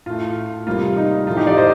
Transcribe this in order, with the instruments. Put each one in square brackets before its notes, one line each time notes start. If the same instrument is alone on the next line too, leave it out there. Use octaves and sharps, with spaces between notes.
[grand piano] A2 A3 F4
C3 G3 A#3 F4
D#4
A2 F3 A3 F4
D#4 G4
D5 F5
C5 D#5